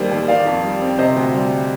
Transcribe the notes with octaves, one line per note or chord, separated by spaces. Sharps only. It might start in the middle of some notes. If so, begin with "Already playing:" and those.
Already playing: D#2 D#3 G3 C5
D#2
D#3 D5 F5
F2
G3
C4
C3 C5 D#5
D2
G3